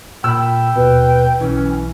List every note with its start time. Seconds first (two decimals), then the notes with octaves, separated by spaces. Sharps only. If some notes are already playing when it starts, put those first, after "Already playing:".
0.24 A#2 G5 B5 E6
0.76 D#2 B2 B4
1.40 B1 E3 C#4